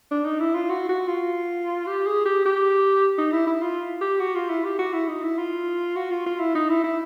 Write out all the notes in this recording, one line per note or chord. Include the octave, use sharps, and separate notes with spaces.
D4
D#4
E4
F4
F#4
F#4
F4
G4
G#4
G4
G4
D#4
E4
E4
F4
G4
F#4
F4
E4
G4
F#4
E4
D#4
E4
F4
F#4
F4
F4
E4
D#4
E4
E4